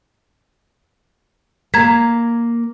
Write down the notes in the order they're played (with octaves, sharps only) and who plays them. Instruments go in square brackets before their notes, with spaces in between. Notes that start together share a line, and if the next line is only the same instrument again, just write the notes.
[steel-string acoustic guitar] A#3 [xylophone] A#5 G#6 B6